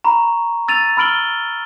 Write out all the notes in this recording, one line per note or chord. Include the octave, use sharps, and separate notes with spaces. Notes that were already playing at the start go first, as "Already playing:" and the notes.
A#5 B5 C#6
E6 A6 D#7 F7
B5 E6 F6 D7 F#7 G7